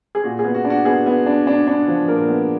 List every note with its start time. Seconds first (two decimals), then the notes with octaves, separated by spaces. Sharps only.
0.15 G#4
0.24 A#2 F#4
0.39 G#4
0.44 B3
0.54 F#4
0.64 D4
0.70 F#4
0.85 B3 G#4
1.06 B3
1.26 D4
1.47 D4
1.67 D4
1.88 F3
2.08 A#2 A#4
2.29 B3